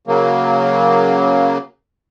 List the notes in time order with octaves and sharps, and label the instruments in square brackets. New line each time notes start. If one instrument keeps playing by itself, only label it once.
[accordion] C#3 F#3 A#3